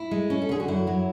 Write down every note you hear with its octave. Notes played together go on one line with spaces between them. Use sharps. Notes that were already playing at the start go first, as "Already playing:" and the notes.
Already playing: E4
G#3
C#4
A4
D3 G#4
F#4
F#2 E4
F#3